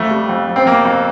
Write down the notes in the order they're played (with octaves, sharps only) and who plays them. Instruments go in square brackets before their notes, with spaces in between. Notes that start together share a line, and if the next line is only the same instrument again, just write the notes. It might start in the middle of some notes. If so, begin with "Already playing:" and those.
Already playing: [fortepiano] F2 A3
G3
F2
F2
C4
F2 A#3
F2